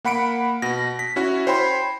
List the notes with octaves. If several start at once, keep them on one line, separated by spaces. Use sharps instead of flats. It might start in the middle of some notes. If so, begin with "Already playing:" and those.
A#3 F#5 B5 C#7 D7
B2 A#6
B6
C#4 E4 F#4
C5 C#5 G5 B5 C6